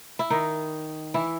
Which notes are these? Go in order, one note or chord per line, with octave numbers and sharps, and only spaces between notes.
E4
D#3 D#4
E3 E4